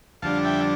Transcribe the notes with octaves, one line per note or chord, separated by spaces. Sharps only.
F2 D3 G3 D4 F5 A5
E5 G5